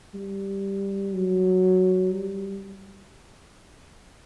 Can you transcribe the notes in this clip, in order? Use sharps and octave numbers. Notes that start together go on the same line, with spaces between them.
G3
F#3
G3